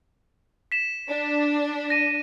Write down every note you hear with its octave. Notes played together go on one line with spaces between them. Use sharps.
B6 E7
D4
A#6 D#7